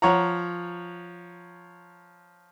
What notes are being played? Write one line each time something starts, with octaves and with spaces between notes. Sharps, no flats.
F3 C#5 F#5 A#5